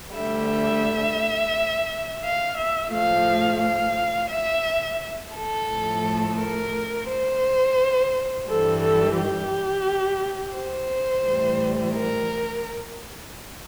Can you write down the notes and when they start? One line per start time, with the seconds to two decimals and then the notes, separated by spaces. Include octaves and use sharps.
0.15 D2 D3 G3 E5
0.50 E5
2.24 F5
2.58 E5
2.93 A2 F3 A3 F5
3.62 F5
4.31 E5
5.36 A4
5.71 A2 F3 A3
6.39 A#4
7.10 C5
8.48 G2 E3 G3 A4
8.82 A4
9.18 G4
10.57 C5
11.25 A2 E3 G3
11.95 A#4